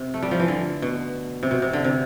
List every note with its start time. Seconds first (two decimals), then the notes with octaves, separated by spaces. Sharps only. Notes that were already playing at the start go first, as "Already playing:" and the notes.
Already playing: C3
0.14 A3
0.23 G3
0.31 F3
0.40 E3
0.48 D3
0.82 B2
1.43 C3
1.51 B2
1.62 C3
1.73 D3
1.84 C3